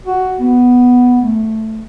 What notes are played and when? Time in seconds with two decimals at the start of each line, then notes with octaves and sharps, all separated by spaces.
0.06 F#4
0.40 B3
1.22 A3